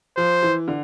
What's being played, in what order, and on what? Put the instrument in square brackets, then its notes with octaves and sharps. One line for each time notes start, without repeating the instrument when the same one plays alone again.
[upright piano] F3 [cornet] C5
[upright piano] E3
D3